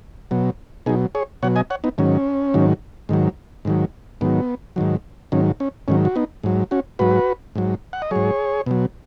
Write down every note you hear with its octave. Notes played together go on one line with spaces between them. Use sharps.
B2 F#3
B2 F#3 D#4 G#4
G#4 C#5
B2 F#3 C#5 F#5
D#5 G#5
C#5 F#5
B3 D#4
G#2 D#3 F#3 C#4
G#2 D#3 F#3
G#2 D#3 F#3
G#2 D#3 F#3
G#2 D#3 F#3 B3
G#2 D#3 F#3
G#2 D#3 F#3 C#4
C#4
G#2 D#3 F#3 C#4
F#4
B3 D#4
G#2 F#3
C#4 F#4
G#2 F#3 F#4 B4
G#2 F#3
F#5
D#5
G#2 F#3 G#4 C#5
B2 F#3